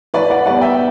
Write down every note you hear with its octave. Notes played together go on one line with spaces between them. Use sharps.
A2 B4 D5
D5 F#5
G3 B3 D5 F#5
E5 G5